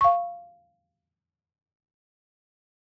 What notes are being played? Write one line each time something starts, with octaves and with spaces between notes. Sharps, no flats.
F5 C#6